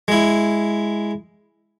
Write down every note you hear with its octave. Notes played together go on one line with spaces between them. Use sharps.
G#3 E4